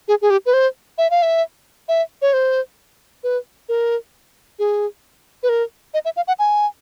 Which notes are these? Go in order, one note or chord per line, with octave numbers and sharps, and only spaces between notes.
G#4
G#4
G4
B4
C5
E5
F5
E5
E5
C#5
C5
B4
A#4
G#4
B4
A#4
D#5
E5
F5
F#5
G#5